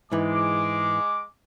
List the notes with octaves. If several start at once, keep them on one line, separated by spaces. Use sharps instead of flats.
G#2 E3 G#3 D6